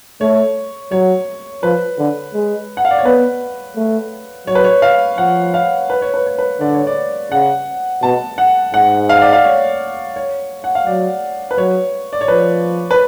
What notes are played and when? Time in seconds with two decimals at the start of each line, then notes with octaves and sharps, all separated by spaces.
0.21 A3 C#5
0.92 F#3 C#5
1.63 F3 B4
1.98 D3
2.34 G#3
2.77 F#5
2.85 F5
2.91 D5
2.98 C#5
3.05 B3 B4
3.76 A3
4.47 F#3 C#5
4.55 B4
4.64 C#5
4.82 F5
5.18 F3 F#5
5.54 F5
5.90 B4
6.02 C#5
6.14 B4
6.26 C#5
6.38 B4
6.60 D3 D5
6.74 C#5
6.87 D5
7.32 C#3 F#5
8.03 B2 A5
8.38 F#5
8.73 G#2 F#5
9.09 F5
9.21 D5
9.33 F5
9.44 C#5
10.16 C#5
10.64 F#5
10.75 F5
10.87 F#3 D5
11.51 B4
11.58 F#3 C#5
12.13 D5
12.21 C#5
12.28 F3 B4
12.91 B4